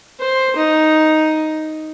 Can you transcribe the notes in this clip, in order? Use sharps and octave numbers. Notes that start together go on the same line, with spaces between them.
C5
D#4